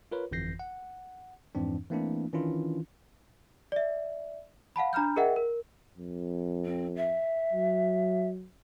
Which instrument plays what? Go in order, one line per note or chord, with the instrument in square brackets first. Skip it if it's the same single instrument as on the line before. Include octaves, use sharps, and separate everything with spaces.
[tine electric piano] F4 A#4 B4 C#5
G1 F2 E3 G6 A#6 C7
F#5
F2 G#2 E3 C4 D4
E3 A3 A#3 C4 D4 E4
D#3 E3 C#4 D4 E4 F4
[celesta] D5 E5
F5 F#5 A5 B5
D4 A#5 B5 F6 G6
G#4 A#4 D#5 E5 F#5 G5
A#4
[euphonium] F2
[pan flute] C4
E5
[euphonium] F#3